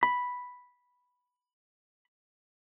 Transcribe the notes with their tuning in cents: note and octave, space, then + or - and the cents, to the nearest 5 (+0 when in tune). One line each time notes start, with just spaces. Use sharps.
B5 +0